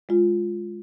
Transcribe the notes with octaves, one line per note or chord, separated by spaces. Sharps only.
G#3 F4